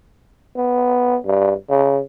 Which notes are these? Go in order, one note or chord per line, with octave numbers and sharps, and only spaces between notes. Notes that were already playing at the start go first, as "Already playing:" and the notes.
B3
G2
C#3